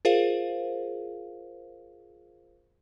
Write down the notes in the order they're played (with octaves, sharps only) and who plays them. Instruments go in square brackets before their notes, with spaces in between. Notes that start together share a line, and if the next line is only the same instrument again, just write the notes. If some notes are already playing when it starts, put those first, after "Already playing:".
[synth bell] F4 G#4 A#4 C5 F5